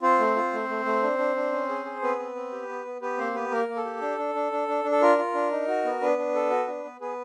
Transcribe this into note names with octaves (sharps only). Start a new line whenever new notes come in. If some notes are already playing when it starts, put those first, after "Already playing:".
C4 F4 C5
A3
F4
A3
A3
A3
D4
D4
D4
C#4
G#4
G#4
B3 C4 B4
C4
C4
G4
B3
B3
B3 G4 B4
A#3 C4 C5
B3 G4 B4
A#3 A#4
A#3
A4
G4
D4
D4
D4
D4
D4
D4
A4
F4 A#4
F4
D4
D#4
F#4
B3
B3 D4 B4
D4
A4
F#4
D4
B3
B3 G#4 B4